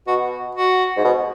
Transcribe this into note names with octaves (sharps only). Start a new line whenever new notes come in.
B2 F#4
F#4
G#2
B2